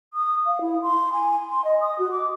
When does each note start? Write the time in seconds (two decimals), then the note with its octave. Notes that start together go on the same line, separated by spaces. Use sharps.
0.14 D#6
0.46 F5
0.61 E4
0.82 C6
1.13 G#5
1.50 C6
1.64 D#5
1.81 D#6
1.99 F#4
2.11 D6